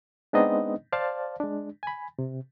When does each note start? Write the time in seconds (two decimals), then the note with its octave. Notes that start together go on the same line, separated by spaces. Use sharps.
0.33 G#3 B3 C4 D4 D#4 D#5
0.93 C5 D5 F5 A5
1.40 G#3 D4
1.83 G#5 B5
2.19 C3